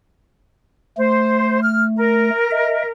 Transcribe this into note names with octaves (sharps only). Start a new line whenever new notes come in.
A3 C5
F6
A#4
D#5 E5